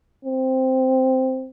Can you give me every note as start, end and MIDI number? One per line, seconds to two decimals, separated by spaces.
0.25 1.50 60